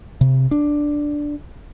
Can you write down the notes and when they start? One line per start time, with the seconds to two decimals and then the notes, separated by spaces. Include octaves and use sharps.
0.21 C3
0.51 D4